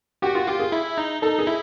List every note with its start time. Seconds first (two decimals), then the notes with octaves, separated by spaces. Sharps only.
0.22 F#4 G4
0.35 F4
0.47 F4 G4
0.60 G#4
0.72 E4
0.98 D#4
1.22 D#4 A4
1.39 G#4
1.47 E4